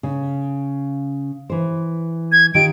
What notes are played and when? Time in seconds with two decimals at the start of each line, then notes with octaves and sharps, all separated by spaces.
0.03 C#3
1.50 E3 C5
2.32 G#6
2.55 D#3 F4 G4 D7